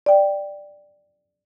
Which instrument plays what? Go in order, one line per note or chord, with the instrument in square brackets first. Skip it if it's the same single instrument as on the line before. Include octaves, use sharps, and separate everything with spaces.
[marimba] D5 G5